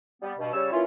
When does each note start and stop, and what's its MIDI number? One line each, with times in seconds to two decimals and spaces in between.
0.22 0.32 55
0.22 0.32 59
0.39 0.52 43
0.39 0.52 47
0.53 0.71 49
0.53 0.71 55
0.53 0.71 73
0.53 0.71 88
0.72 0.83 52
0.72 0.83 58
0.72 0.83 61
0.72 0.83 64
0.72 0.83 65